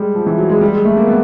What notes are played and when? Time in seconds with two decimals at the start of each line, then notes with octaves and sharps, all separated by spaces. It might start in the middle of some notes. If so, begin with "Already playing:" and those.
Already playing: G3 G#3
0.15 F3
0.26 E3
0.38 F#3
0.49 G#3
0.61 G3
0.72 G#3
0.85 A3
0.96 A#3
1.07 B3